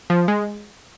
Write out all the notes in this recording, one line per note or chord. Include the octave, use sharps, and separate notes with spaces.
F3
G#3